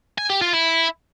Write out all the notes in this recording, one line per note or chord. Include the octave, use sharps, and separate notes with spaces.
G#5
G4
F4
E4